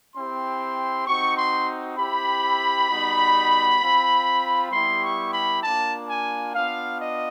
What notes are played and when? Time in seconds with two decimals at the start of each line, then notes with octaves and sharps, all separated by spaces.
0.16 C4 E4 G4 C6
1.07 C4 D#4 F#4 C#6
1.38 C6
1.98 C4 E4 G4 B5
2.89 G3 B3 D#4 F#4
3.81 C4 F4
4.72 G3 B3 E4 G4 C6
5.03 C#6
5.33 B5
5.63 A#3 D4 F4 A5
6.09 G#5
6.54 B3 D4 F4 F5
7.00 D#5